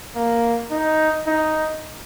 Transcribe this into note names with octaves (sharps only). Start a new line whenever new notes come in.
A#3
D#4
D#4